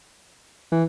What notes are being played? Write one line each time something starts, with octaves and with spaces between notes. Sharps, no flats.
E3